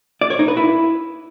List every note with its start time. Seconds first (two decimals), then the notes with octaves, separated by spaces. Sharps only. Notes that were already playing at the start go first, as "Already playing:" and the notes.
0.21 D5
0.30 C#5
0.39 D#4
0.48 B4
0.57 E4